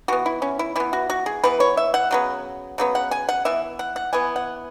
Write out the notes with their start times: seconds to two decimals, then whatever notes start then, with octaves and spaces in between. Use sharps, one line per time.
0.08 E3 B3 F#4
0.26 E4
0.42 C#4
0.59 E4
0.76 E3 B3 E4
0.93 F#4
1.10 F#4
1.26 G#4
1.43 E3 B3 B4
1.60 C#5
1.77 E5
1.94 F#5
2.11 C#3 F#3 B3
2.78 C#3 F#3 B3
2.95 F#5
3.11 G#5
3.29 F#5
3.45 E3 B3 E5
3.79 F#5
3.96 F#5
4.13 E3 B3 G#5
4.36 F#5